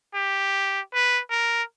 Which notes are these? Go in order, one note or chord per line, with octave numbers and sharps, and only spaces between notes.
G4
B4
A#4